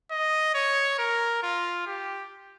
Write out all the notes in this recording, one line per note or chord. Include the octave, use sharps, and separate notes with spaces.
D#5
C#5
A#4
F4
G4